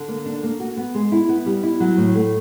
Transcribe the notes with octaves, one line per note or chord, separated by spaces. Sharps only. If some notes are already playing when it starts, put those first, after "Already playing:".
Already playing: D3
A#3
D4
A#3
F#4
B3
G#3
E4
B3
G3
E4
F#3
A2
A3